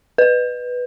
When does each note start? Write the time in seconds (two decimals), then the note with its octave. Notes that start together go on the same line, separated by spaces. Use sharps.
0.18 B4